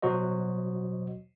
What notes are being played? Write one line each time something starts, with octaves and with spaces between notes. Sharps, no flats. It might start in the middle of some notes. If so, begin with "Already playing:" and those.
B2 F#3 F#4 C5 D#5